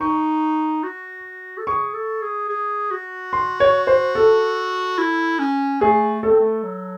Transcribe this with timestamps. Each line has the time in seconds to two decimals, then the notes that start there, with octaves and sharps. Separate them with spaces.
0.01 D#4 C#6
0.83 F#4
1.58 A4
1.67 G#4 C#6
1.94 A4
2.22 G#4
2.49 G#4
2.91 F#4
3.33 C6
3.60 C#5
3.87 C5
4.15 A4
4.98 E4
5.39 C#4
5.81 A3 G#4
6.23 A3 A4
6.31 C4
6.40 A3
6.63 F#3